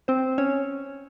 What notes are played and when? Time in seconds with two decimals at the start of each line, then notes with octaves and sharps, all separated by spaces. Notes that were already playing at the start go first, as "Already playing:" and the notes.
0.08 C4 C5
0.38 C#4 C#5